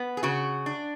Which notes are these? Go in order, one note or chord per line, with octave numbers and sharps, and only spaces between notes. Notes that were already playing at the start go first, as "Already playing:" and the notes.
Already playing: B3
G#4
C#3 F#4
D4